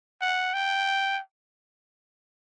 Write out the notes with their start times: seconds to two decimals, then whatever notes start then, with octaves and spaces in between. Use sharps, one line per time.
0.21 F#5
0.53 G5